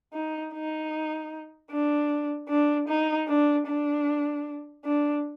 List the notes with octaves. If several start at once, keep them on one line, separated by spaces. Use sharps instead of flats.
D#4
D#4
D4
D4
D#4
D4
D4
D4